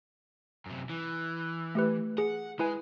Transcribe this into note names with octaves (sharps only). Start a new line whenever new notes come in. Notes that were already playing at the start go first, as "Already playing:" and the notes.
F#2 C3
E3
A3 G4 B4
G#4 F#5
G#3 E4 B4 G#5